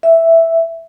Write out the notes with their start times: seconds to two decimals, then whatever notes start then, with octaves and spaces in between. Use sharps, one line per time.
0.03 E5